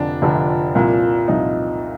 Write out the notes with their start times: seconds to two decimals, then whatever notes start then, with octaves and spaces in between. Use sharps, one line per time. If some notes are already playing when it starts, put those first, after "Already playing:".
Already playing: F1 F2 D3 F3 D4
0.22 F1 F2 D3 F3
0.75 C2 A#2 F3
1.28 C2 A#2 F3 D#4